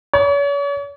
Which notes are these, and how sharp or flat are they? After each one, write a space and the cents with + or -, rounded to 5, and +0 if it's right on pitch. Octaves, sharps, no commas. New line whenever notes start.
C#5 +40